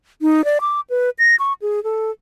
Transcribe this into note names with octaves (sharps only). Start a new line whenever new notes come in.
D#4
D5
D6
B4
A#6
C#6
G#4
A4